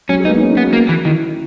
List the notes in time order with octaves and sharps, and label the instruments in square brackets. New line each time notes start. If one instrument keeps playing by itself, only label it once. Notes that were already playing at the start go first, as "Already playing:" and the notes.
[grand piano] F#3 [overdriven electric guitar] C#4
[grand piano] G#3
[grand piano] B3 [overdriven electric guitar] D#4
[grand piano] A#3
D#4
C#4
D#4
[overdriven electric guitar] B3
[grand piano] F#4
[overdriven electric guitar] A#3
E3
[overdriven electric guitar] D#3 [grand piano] E4